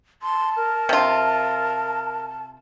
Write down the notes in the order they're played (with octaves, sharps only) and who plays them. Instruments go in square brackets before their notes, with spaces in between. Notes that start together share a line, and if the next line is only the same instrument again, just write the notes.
[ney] A5 [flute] C6
[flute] A#4
[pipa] C3 F4